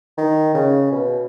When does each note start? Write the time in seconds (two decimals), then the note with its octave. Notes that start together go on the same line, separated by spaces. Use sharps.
0.17 D#3
0.55 C#3
0.92 B2